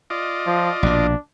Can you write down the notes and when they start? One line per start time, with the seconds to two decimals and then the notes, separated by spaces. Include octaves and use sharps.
0.10 F4 D5 D#5
0.46 F3
0.83 A#1 B2 D4